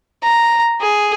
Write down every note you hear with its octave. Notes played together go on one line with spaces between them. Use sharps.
A#5
G#4